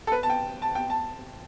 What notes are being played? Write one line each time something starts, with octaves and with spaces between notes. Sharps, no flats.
A4
B4
A5
G5
A5
G5
A5